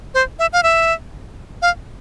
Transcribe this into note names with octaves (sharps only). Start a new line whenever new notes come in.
C5
E5
F5
E5
F5